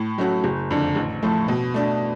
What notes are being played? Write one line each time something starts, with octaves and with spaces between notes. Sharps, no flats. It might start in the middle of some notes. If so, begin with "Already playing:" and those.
Already playing: A2
F#3 A3 C#4 F#4
F#1
F2 D3
A1
A2 F3 A3
B2
A3 D4